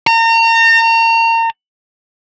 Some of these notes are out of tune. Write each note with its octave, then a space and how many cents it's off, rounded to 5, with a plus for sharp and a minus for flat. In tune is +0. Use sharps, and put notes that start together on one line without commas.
A#5 -35